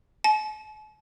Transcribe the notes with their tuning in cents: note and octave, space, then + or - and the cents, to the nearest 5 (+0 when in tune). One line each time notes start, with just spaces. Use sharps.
A5 -45